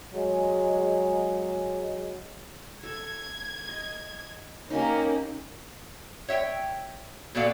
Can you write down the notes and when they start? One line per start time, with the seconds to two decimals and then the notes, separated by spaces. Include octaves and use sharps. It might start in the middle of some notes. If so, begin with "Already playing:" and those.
0.13 F#3 G#3
2.83 A4 G#6
3.69 D#5
4.70 A#3 C#4 D#4 G4
6.28 C#5 E5 F5 G5
7.35 A#2 B3 F#4 A4 D5 F5